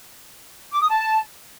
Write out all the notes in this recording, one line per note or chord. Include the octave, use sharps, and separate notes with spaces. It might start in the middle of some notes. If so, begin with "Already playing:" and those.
D6
D#6
A5